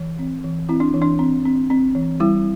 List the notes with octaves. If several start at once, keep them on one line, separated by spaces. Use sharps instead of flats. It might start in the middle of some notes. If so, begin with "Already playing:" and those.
Already playing: E3
C4
E3
C4 E4
D4
E3
D4
C4
C4
C4
E3
G3 E4